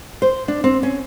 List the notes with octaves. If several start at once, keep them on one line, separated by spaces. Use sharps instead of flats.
C5
D4
C4
C#4